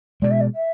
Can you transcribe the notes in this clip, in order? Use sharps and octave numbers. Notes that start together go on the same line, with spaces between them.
B2 G#3 D5
E5
D5
E5